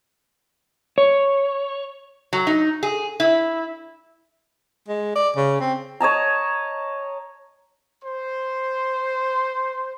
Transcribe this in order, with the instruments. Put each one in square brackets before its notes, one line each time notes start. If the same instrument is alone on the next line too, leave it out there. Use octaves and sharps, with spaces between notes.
[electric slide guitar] C#5
[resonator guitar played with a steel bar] F#3
D#4
G#4
E4
[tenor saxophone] G#3
D5
C#3
C4
[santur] C#5 D#5 A5 A#5
[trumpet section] C5 C6